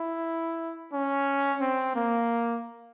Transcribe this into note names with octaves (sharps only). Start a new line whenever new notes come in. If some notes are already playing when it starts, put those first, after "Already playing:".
Already playing: E4
C#4
C4
A#3